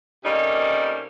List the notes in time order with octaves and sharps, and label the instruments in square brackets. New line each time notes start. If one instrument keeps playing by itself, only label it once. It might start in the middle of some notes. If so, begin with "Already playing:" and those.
[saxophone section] C3 G3 A3 A#3 C#4 D#4